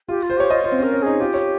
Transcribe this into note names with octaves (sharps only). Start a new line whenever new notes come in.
F4 G4
F4
C5
G4 C#5
F4 D#5
F4 C5
C4
C#4 A#4
C#4
D#4 G#4
F4 G4
C#5